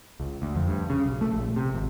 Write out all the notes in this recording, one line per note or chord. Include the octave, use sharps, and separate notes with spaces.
C#2
D2
F2
G2
C#3
B1
A3
A#1
C3
G#1